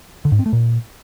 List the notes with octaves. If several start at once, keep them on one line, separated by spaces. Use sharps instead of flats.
D3
G#2
C4
A3
A#2